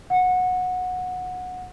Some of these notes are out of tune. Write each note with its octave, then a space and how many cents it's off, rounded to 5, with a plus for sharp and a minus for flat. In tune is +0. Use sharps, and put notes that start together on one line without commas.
F#5 -15